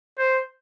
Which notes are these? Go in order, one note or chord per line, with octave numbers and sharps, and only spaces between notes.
C5